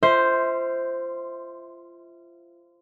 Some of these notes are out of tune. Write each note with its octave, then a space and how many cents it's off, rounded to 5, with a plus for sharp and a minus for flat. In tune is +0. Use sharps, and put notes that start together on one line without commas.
F4 -25 C5 +0 E5 -25